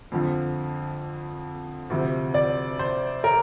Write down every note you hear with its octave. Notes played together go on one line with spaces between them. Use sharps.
F2 D3 F3
D2 C3 F3
D5
C5
A#4